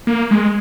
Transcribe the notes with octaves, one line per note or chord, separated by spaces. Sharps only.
A#3
G#3